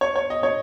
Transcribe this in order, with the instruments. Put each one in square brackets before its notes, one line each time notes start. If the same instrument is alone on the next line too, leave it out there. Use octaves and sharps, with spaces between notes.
[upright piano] C#5
C#5
D#5
C#5